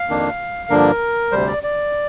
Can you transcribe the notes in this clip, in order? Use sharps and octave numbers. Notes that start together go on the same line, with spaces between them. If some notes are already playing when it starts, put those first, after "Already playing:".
Already playing: F5
F2 D#3 A#3 D4
G2 D3 F3 A#3 D4 A#4
D2 C3 G3 C5
D5
D5